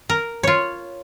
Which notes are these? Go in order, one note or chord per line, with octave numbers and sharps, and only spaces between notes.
A#4
F4 C#5